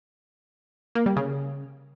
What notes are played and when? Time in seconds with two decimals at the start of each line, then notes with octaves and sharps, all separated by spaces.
0.95 A#3
1.06 G3
1.17 C#3